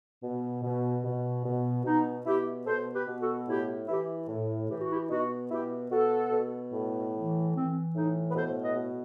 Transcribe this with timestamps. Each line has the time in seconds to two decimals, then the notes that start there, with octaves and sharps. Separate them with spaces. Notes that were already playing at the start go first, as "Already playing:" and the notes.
0.23 B2
0.63 B2
1.04 B2
1.45 B2
1.84 B2 D#4
2.25 B2 E4 G4
2.66 B2 A4 C5
2.93 G4 B4
3.08 B2
3.20 F#4 A4
3.47 A2 E4 G4
3.88 E3 E4 G4
4.28 A2
4.69 E3 G4
4.80 F#4
4.90 E4 G4
5.10 B2 D#4 F#4
5.51 B2 E4 G4
5.91 B2 F#4 A4
6.32 B2
6.72 A2
7.14 E3
7.54 E3 C4
7.95 A2 D#4
8.31 B4
8.35 B2 A4 C5
8.62 B4 D#5
8.75 B2